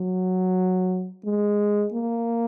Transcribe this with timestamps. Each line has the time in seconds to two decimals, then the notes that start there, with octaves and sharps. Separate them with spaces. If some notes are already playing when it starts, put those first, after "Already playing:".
Already playing: F#3
1.25 G#3
1.93 A#3